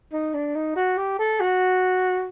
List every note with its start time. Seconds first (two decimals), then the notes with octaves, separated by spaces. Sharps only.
0.12 D#4
0.34 D4
0.55 D#4
0.76 F#4
0.97 G4
1.19 A4
1.40 F#4